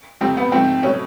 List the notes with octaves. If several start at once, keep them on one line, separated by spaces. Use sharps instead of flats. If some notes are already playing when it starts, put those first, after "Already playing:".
F2 C3 F3 A3 C4
B3
G#2 F3 A3 C4
B2 F#3 A3 C#4